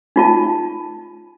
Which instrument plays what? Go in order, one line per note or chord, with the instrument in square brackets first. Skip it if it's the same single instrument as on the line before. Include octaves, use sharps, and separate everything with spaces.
[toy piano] D#4 F4 A5